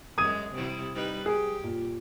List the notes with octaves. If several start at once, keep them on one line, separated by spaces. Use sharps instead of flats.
F#2 G#3 D#6 G#6 D#7
C3 G3 E4
G3 D#4 B4
G4 G#4
A#2